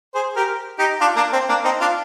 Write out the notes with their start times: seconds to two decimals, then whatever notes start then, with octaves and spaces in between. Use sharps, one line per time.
0.15 G#4 C5
0.36 G4 A#4
0.79 D#4 G4
1.01 D4 F4
1.16 A#3 D4
1.33 C4
1.49 A#3 D4
1.64 C4 D#4
1.81 D4 F4